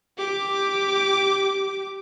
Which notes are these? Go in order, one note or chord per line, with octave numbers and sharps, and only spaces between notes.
G4 D6